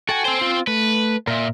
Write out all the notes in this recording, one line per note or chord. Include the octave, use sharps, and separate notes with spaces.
F#4 A4 G5 G#5
C4 C5
F4
A3 B4
A#2 A#4 E5